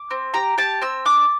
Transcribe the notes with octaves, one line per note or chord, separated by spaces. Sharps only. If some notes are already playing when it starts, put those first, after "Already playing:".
Already playing: D6
C4
G4 A#5
G4 A5
C4 E6
D4 D6